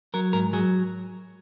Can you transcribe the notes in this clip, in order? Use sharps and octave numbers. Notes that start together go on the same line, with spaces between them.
F#3 A#4
G#2 A#4
F#3 G#4